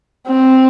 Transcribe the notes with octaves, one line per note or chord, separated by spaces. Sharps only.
C4